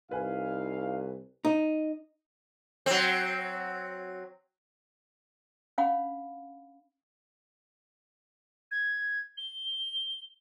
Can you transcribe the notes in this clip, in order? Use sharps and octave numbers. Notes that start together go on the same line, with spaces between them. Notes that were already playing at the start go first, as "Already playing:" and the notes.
C2 D#4 E4 B4 F5 G#5
D#4
F#3 C4
C#4 D4 F5 F#5 B5
G#6
G7